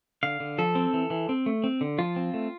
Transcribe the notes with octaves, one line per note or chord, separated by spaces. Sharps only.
D3 F5
D3
F3 A4
C4
E3
E3
C4
A3
C4
D3
F3 F4
C4
A3